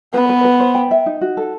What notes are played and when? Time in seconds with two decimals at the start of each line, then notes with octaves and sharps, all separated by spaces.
0.13 B3 B4
0.29 B4
0.45 B4
0.60 C5
0.75 G5
0.91 E5
1.06 D#4
1.21 F#4
1.37 A4